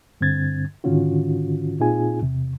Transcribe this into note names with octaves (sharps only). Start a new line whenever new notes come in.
G2 D3 C4 G#6 A6
G#2 D3 D#3 C#4 F4 F#4
A#2 C4 D#4 F4 G#4 G#5
E2 C3